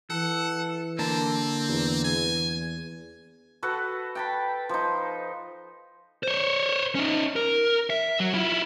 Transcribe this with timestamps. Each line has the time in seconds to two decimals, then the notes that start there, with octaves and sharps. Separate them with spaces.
0.10 E3 A4 F#5
0.99 D3 A#3 C4 A5
1.69 E2
2.04 G#5
3.63 F#4 A4 B4 F#5
4.15 G5 A5 B5
4.69 F3 D#4
6.23 C5 C#5
6.95 C#4 D#4
7.36 A#4
7.90 E5
8.20 F#3
8.34 E4 F4